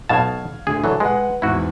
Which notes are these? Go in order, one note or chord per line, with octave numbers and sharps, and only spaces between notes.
B1 B2 F5 A5 G#6
D2 D3 G#4
E3 F#3 D4 A4
G#3 B4 F#5
E2 G#2 E4 F#4